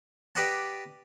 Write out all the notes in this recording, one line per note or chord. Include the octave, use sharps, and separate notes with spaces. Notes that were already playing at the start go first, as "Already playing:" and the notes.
G4 B4 D5 D#5 F#5 A5